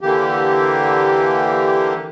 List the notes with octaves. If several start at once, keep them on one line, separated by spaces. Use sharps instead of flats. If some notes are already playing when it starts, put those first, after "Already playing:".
D3 E3 A#3 G4